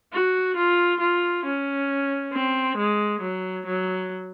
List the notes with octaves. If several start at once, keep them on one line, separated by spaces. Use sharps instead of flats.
F#4
F4
F4
C#4
C4
G#3
F#3
F#3